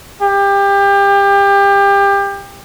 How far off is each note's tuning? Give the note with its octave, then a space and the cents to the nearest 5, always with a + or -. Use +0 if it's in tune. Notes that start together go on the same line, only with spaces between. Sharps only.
G4 +25